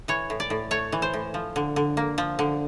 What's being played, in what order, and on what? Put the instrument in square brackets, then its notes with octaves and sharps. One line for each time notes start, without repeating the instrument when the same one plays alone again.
[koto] E3 C#5
A2
D5
A2
A3 C#5
E3
C5
A2
F3
D3
D3
A#3
F3
D3